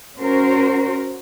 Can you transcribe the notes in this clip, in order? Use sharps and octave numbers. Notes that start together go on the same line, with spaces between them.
C#4 F#4 A#4 C5